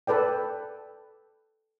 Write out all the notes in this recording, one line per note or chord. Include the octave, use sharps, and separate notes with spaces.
A4 B4 D5 G5